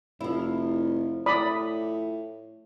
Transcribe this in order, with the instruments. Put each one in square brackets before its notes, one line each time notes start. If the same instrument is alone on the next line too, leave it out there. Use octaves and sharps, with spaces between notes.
[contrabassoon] F1 [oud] F3 E4
[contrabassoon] A2 [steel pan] D5 B5 D#6